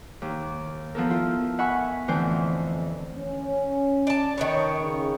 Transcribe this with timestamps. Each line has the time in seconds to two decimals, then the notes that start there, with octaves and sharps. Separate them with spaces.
0.22 D#2
0.95 F3 B3 A4 A#4
1.09 E4 F4
1.58 E5 F#5 G#5 B5 C#6
2.08 F2 A2 D3 E3 C5 G#5
3.16 C#4
4.07 D5 A5
4.38 D#3 B3 C#5
4.81 C#3